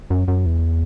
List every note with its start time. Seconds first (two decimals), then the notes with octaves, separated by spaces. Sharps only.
0.10 F#2
0.28 F#2
0.46 E2